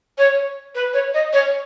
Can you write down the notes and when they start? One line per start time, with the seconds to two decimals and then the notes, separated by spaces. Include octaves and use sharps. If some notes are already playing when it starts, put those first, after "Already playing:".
0.18 C#5
0.75 B4
0.94 C#5
1.14 D#5
1.33 C#5